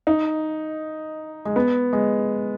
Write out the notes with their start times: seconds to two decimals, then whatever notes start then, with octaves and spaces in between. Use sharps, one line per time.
0.07 D#4
1.45 G#3
1.56 B3
1.93 G#3